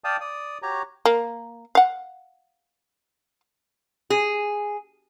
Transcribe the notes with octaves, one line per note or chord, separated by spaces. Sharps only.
D5 F5 G5 A5 D#6
D5 D#6
F#4 G4 C#5 A#5
A#3
F5 F#5
G#4